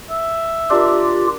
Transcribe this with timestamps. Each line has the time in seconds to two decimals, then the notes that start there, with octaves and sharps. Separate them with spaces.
0.10 E5
0.70 D4 F4 G4 A#4